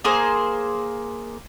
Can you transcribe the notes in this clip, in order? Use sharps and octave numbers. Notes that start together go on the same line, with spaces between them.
A#3 G#4 C5